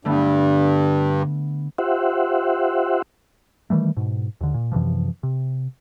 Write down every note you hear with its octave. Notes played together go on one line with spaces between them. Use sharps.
G2 D3 A3 B3
F4 G4 C5 E5 F#5
D#3 E3 G3 A3
G#2 B2
D#2 D3
A#2
F#2 C3 E3 F3
C3